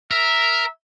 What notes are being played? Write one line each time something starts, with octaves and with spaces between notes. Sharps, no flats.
A#4 E5